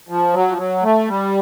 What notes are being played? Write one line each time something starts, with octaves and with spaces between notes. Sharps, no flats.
F3
F#3
F3
F#3
A3
G3